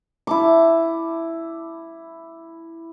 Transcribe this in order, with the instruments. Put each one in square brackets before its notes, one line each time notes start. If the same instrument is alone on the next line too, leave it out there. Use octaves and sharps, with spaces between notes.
[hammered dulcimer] E4 A5 D6